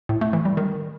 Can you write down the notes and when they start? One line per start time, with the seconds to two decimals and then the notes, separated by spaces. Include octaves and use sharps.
0.09 A2
0.21 A3
0.33 E3
0.45 G3
0.57 D#3